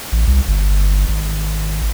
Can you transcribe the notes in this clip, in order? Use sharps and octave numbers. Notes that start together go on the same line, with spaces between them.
A1
C2
G1
G#1